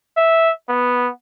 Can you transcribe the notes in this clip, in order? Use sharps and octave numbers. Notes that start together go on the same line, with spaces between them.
E5
B3